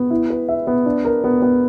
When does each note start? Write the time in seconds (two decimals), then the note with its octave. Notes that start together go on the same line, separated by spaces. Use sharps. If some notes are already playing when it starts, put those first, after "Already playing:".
Already playing: B3
0.10 E4
0.30 B4
0.49 E5
0.67 B3
0.86 D4
1.05 A#4
1.24 B3
1.42 B3